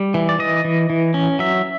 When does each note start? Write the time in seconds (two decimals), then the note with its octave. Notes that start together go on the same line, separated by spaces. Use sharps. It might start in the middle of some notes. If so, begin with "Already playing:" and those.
Already playing: G3
0.14 E3
0.29 D5
0.39 E3 D#5
0.64 E3
0.90 E3
1.14 C#4
1.39 F#3 E5